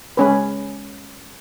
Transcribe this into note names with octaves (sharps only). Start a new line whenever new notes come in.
G#3 C#4 B4